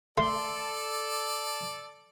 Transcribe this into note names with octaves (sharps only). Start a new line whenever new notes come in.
A3 A4 D5 C6